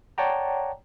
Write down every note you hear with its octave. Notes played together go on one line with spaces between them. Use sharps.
C#5 D5 F#5 G5 A5 A#5